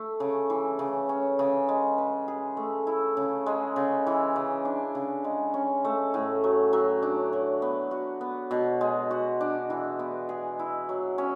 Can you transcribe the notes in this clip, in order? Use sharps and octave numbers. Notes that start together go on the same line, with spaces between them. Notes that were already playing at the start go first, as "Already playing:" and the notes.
Already playing: A3
C#3
E3
C#3
C#4
C#3
G#3
B4
G#4
A3
E4
C#3
G#3
C#3
E3
C#3
D4
C#3
G#3
C#4
A3
A2
F#3
F#3
D4
F#3
B3
F#4
B3
B2
G#3
F#4
D4
E3
B3
G#4
E4
F#3
C#4